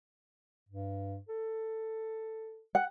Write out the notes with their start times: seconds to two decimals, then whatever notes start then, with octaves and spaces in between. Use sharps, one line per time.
0.69 G2
1.29 A4
2.75 F#5